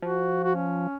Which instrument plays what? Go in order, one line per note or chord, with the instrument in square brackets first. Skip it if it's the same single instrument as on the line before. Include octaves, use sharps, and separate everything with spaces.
[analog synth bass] F3 [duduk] F#4
[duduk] F#4
C#4